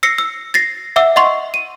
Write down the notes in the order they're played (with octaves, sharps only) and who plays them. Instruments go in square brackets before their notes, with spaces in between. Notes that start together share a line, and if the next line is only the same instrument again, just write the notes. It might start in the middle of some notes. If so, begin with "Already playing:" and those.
[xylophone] E6 A#6 C7 C#7
E6
A6 A#6 C7
E5 F#5 D6 E6
D#5 F#5 C6 C#6
D#7